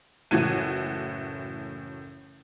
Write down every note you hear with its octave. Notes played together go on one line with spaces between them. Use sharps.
F#1 A2 E3 F#4 G#6 D#7